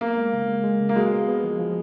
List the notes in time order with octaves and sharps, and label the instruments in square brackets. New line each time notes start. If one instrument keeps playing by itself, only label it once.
[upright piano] A#3 [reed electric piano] B3
[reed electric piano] G#3
C#3
G#3
G#3
C#3
[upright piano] A#3
[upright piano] G#3 [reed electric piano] F#4
[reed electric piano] B3
B3
F3
F3